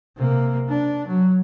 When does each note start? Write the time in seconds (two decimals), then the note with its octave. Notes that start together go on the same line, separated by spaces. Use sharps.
0.17 C3 A#3
0.69 D4
1.07 F#3